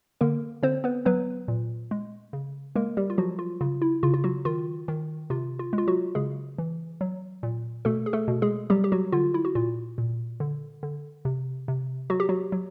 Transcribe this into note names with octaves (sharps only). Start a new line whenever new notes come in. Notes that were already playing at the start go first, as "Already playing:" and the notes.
D3 A#3 A#4
D3 C4 C5
B3 B4
F#3 B3 B4
A#2
G#3
C#3
G#3 A#3 A#4
G3 G4
F4
F3 F#3 F#4
F4
C#3 F4
E4
C#3 F4
F4
F#3 F#4
D#3 F4
D#3
C3 F4
F4
G#3
F4
F#3 F#4
C#3 G#3 G#4
E3
F#3
A#2
B2 A3 A4
G#4
A3 A4
B2
G#3 G#4
F#3 G3 G4
G4
F#3 F#4
D3 F4
E4
F#4
A#2 F4
A#2
D3
D3
C3
C3
F#3 F#4
G4
F#3 F#4
F#3